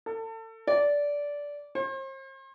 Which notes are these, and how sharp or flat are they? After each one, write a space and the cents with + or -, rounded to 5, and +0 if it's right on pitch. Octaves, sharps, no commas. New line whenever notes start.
A4 +30
D5 -15
C5 +40